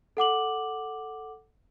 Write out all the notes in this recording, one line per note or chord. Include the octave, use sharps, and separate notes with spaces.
A4 F#5 D6 F#7